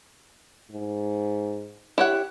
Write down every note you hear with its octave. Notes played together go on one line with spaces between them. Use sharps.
G#2
E4 G4 C#5 F#5